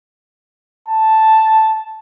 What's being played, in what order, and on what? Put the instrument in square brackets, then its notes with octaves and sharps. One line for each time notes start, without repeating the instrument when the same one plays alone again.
[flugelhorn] A5